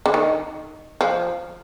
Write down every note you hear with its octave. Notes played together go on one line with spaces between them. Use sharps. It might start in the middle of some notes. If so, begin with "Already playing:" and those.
D3
D#3
F3